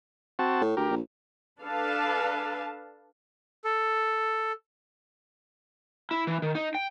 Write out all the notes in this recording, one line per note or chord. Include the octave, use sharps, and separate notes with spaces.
C4 F#4 A5
A2
D2 G4 A#4
A#1
D4 A4 B4 F5 A5
A4
E4
E3
D#3
D#4
G5